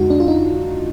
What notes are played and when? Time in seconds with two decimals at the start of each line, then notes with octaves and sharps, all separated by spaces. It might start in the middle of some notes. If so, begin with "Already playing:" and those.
Already playing: F2 D3 G#3 D#4 F#4
0.10 D4
0.20 F4
0.28 D#4